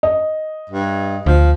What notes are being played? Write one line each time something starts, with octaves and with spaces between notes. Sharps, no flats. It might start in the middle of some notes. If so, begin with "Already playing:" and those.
D#5
G2
D2 F3